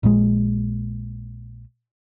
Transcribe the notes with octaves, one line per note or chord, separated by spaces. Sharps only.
A#1 A#2 D#3 G#3